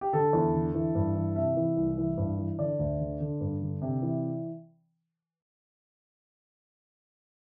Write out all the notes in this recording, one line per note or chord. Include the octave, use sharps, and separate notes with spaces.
G4
D3 A4
E2
D3
E3
G2
E3
C3 E5
E3
C2
E3
G2
E3
D3 D5
D2
D3
D3
G2
D3
C3
E3